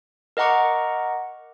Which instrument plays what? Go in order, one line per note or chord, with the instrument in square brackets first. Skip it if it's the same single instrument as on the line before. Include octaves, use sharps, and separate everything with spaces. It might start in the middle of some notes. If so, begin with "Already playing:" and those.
[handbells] A#4 D#5 F#5 A#5 C#6 D6